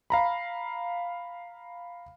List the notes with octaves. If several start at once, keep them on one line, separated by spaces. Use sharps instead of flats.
F5 A#5 B5